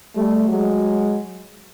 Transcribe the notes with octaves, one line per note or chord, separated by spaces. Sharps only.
G3 A3
F#3 G#3